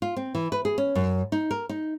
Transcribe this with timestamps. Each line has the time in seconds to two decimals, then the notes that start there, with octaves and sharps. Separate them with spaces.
0.02 F4
0.16 C4
0.35 E3
0.52 B4
0.65 G#4
0.78 C#4
0.95 F#2
1.32 D#4
1.51 A#4
1.69 D#4